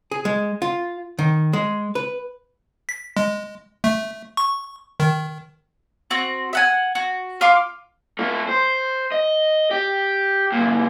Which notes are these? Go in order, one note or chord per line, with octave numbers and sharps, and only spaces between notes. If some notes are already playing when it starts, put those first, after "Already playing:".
G#4
G#3
F4
D#3
G#3
B4
B6
G#3
A3
C#6
D#3
C4 F#4
E5 F#5 G#5
F#4
F4 F5 C6 D6
A3 F4
C5
D#5
G4
C#2 A#2